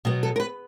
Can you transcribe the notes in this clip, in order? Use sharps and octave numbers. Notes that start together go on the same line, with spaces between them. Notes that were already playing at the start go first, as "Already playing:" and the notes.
B2 F#3 B3
A4
A#4
B4